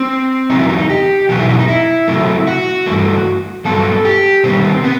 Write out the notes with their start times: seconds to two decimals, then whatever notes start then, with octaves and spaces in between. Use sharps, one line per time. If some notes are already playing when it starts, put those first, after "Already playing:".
Already playing: C4
0.50 E2 C3 F#3 B3 D#4
0.59 E4
0.69 D#4
0.90 G4
1.29 E2 B2 F#3 B3 F#4
1.39 E4
1.49 E4
1.59 D#4
1.68 E4
2.08 C3 F#3 A3
2.47 F#4
2.86 G2 E3 A3
3.65 G2 F#3 B3 A4
4.05 G4
4.44 C3 D#3 G3 B3 C4
4.84 B3